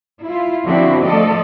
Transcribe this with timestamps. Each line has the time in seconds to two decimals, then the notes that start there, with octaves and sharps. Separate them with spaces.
0.25 E4 F4
0.65 D3 F3 C4 D4 E4 F#4
1.03 F3 A3 A4 D5 D#5